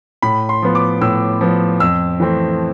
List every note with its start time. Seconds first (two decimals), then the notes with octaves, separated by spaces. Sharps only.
0.22 A2 B5
0.49 C6
0.62 F3 B3
0.75 D6
1.01 A2 E6
1.41 F3 B3
1.80 F2 E6
2.20 E3 A3 C4